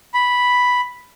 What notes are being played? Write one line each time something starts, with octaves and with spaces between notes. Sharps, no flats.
B5